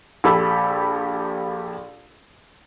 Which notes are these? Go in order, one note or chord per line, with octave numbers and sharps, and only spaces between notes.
A#1 G4 A4 B5 E6